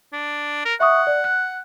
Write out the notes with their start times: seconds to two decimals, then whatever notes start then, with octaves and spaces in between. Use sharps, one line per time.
0.13 D4
0.65 A#4
0.80 E5 F#5 C#6 D#6
1.07 D5
1.24 F#6